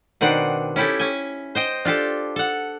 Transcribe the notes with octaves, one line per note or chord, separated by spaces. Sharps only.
B2 D#3 C4 D4 F#5
C#4 E4 G4 A4
C#4 G#5
C5 D#5 G5
D4 F4 G4 A4
A4 F#5